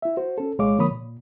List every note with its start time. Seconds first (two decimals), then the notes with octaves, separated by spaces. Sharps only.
0.02 E4 E5
0.17 F#4 C5
0.38 C#4 A4
0.58 C2 A#2 G#3 C#5 F5 D6
0.78 D3 F3 A#3 C#5 B5 D#6
0.90 A#2